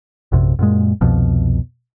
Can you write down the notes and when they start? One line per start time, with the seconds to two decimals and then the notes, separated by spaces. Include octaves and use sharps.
0.32 A#1 F#2 C3
0.59 F#2 A#2 G#3
1.01 C2 F2 B2 F3